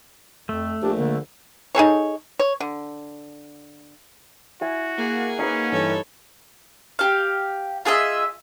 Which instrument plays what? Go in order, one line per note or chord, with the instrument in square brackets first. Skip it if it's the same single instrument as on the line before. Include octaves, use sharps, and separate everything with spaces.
[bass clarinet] F2 [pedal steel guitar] A3
[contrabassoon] A#1 [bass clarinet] D4 [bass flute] G4
[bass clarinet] D3 [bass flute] A#3
[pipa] D#4 G#4 A4 C#5
C#5
D3
[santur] E4 E5 G#5 [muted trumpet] F#4
[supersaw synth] A#3 F#5 [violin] G#4
[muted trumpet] C#4 [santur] D#4 B4 D#5
[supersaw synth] G2 E3 [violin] A4 C#5
[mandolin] G4 F5
F4 G#4 D#5 E5